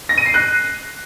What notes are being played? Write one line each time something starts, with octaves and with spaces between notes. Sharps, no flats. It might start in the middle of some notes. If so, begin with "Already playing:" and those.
A#6
D#7
C7
F#6